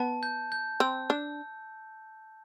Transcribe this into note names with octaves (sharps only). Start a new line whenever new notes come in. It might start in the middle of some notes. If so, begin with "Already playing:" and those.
Already playing: B3 A5
G6
G6
C4 E6
D4 E6